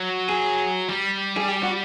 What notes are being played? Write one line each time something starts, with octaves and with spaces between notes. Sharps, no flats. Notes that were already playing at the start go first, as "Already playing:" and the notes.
Already playing: F#3
G#4
G3
G#4
G4
F#4